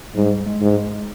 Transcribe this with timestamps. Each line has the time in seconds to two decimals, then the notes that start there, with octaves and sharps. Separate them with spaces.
0.15 G#2 G3
0.46 G#3
0.61 G#2
0.77 G#3